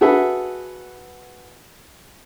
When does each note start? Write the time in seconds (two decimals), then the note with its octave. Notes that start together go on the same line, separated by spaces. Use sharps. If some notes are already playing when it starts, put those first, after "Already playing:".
0.01 F#4 G#4 A4 B4 E5